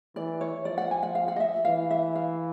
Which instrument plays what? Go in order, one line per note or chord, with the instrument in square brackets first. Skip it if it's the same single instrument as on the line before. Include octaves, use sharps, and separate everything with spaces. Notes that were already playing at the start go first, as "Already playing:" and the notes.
[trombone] E3 [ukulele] D5
[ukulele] C#5
[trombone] F3 [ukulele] D5
[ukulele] F#5
G#5
F#5
F5
F#5
D#5
E5
[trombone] E3 [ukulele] F5
[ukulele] E5
F5